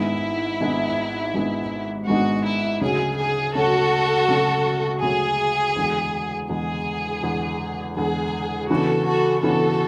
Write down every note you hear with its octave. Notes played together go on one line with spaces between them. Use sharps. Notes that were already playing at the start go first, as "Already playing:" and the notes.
Already playing: G#1 G#2 G#3 B3 D4 E4
G#1 G#2 G#3 B3 D4
G#1 G#2 G#3 B3 D4
G#1 G#2 G#3 B3 D4 F#4
E4
D2 C#3 F#3 G#4
G#4
D2 C#3 F#3 F#4 A4
D2 C#3 F#3
D2 C#3 F#3 G#4
E2 D3 G#3
E2 D3 G#3 G#4
E2 D3 G#3
E2 D3 G#3 G#4
C#3 E3 B3 D4 F#4 A4
F#4 A4
C#3 E3 B3 D4 F#4 A4